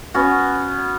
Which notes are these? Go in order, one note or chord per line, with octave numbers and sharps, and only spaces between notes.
B3 C#4 F#4